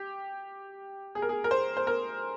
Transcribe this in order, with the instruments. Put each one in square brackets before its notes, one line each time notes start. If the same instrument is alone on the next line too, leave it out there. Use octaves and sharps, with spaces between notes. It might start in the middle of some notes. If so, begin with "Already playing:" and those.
Already playing: [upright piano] G4
G#4
A#4
G#4
A#4
C5
C5
A#4